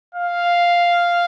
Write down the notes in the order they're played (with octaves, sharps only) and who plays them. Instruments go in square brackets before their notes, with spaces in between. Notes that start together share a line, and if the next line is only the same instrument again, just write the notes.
[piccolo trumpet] F5